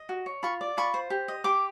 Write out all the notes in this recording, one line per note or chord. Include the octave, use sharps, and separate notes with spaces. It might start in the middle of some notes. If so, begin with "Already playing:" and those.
Already playing: D#5
F#4
C#5
F4 B5 C#6
D5
F4 B5 C#6
C5
G4
D#5
G4 C6 D6